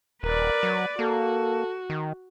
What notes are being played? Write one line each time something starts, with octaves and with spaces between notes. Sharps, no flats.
D#1 A#4 B4 D5
F#3
A#3 F#4 A4
D#3